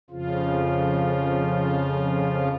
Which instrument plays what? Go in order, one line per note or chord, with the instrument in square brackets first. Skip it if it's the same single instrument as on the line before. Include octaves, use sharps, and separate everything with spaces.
[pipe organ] F2 C#3 F3 F4